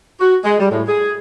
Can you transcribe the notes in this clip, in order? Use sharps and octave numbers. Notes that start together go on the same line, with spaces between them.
F#4
G#3
G3
A2
G#4